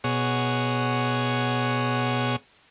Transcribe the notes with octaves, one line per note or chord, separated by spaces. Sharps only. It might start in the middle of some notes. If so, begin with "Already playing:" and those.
B2 G#4 C#5 F#5